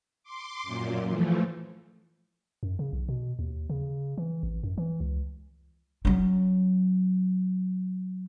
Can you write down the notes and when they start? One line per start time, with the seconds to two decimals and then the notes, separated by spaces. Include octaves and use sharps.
0.24 C6 D6
0.63 F#2 A#2
1.09 E3 F3 A3
2.63 F#2
2.79 C#3
2.93 B1
3.09 B2
3.39 D#2
3.70 C#3
4.18 E3
4.43 A1
4.63 F#2
4.78 E3
5.00 C#2
6.05 F#3 C#4